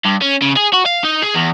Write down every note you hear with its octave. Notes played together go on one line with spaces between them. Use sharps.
G2
C#4
C#3
G#4
F#4
F5
D#4
G#4
E2